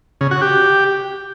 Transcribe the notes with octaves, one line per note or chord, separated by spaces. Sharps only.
C#3
F#4
G4